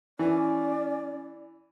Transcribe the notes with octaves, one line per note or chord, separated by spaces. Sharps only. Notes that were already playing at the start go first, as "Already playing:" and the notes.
E3 C#4 D5